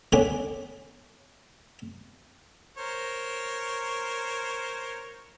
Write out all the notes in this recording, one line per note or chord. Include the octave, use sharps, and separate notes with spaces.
C#2 D3 B3 C#5 G#5 D6
A#4 C5 C#5